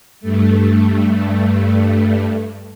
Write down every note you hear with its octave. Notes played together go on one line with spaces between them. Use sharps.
G2 A3